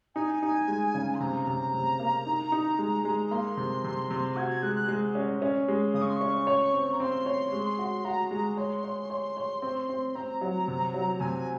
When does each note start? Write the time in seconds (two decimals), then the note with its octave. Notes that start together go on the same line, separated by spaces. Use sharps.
0.15 D#4 G#5
0.42 D#4
0.68 G#3
0.95 C#3
1.15 C6
1.20 C3 A#5
1.47 C3
1.74 C3
2.00 A#3
2.26 D#4
2.52 D#4
2.79 G#3
3.05 G#3
3.27 A#5
3.31 A#3 C6
3.57 C3
3.84 C3
4.11 C3
4.36 F#4 G#6
4.50 G#6
4.62 G#3 F#6
4.76 F#6
4.88 G#3
5.15 C#4
5.42 C#4
5.68 G#3
5.94 C#3 D#6
6.02 C#6
6.08 C6
6.16 C#4 C#6
6.47 C#5
6.73 C4
6.93 A#5
7.00 C4 C6
7.26 C#5
7.52 G#3
7.79 F#4
8.05 F#4 A#5
8.31 G#3
8.57 C#5 C6
8.84 C#5
9.10 C#5
9.37 C#5
9.62 C4
9.89 C4
10.15 C4 A#5
10.41 F#3
10.68 C3
10.94 F#3
11.20 C3 G#5